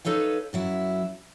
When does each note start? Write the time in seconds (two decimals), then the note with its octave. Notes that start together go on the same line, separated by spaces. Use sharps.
0.05 D#4 A4 B4 C#5 F5
0.53 F#2 F#3 E4